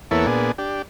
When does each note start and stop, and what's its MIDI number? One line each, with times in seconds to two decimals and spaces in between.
0.11 0.26 40
0.11 0.26 58
0.11 0.26 59
0.11 0.26 64
0.11 0.26 69
0.11 0.26 73
0.27 0.52 46
0.27 0.52 59
0.27 0.52 62
0.27 0.52 68
0.58 0.82 62
0.58 0.82 67